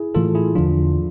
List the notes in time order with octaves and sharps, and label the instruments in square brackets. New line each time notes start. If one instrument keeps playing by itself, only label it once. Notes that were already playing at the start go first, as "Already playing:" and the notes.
Already playing: [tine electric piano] E4 G#4
[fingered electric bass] A2 E3 A3 [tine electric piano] F4 A4
[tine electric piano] E4 G#4
[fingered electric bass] E2 D3 F3 [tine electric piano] D4 F4